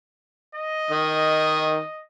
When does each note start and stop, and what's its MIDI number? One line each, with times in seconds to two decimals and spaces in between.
0.55 2.03 75
0.90 1.82 51